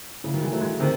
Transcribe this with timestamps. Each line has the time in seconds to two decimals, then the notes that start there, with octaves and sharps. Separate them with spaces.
0.24 A2 C#3
0.33 D#3 F#3
0.42 E3 G#3
0.52 F#3 A3
0.61 E3 G#3
0.80 C3 D#3